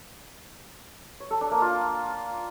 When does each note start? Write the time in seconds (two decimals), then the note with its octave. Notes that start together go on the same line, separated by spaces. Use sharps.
1.20 C#5
1.31 A4
1.41 D4
1.51 A#3
1.62 F4